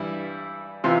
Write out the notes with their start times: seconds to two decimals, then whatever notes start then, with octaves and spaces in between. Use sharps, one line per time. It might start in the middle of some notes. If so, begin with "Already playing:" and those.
Already playing: G2 E3 G3 E4
0.84 C3 E3 F4